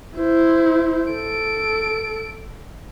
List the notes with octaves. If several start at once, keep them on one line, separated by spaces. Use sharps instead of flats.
E4 C5
A4 D7